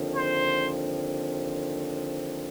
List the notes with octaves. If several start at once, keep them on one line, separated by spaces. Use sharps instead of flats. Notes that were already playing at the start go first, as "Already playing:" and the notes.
Already playing: D#2 D3 F3 C4
C5